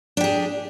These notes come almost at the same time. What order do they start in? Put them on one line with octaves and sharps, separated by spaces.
D4 G4 G#4